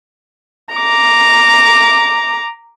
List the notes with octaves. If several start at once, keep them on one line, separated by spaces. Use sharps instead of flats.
A#5 D6